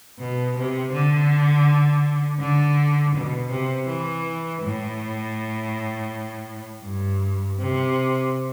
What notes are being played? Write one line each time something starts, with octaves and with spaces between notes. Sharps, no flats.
B2
C3
D3
D3
B2
C3
E3
A2
G2
C3